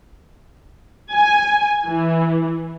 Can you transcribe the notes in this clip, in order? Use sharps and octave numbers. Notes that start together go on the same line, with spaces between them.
G#5
E3